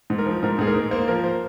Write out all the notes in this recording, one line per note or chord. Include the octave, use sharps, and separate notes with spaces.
G#2
A#4
F3
G#2 A#4
G#2 G#4
A#4
G#2
A#3 C5
F3 A#4
C5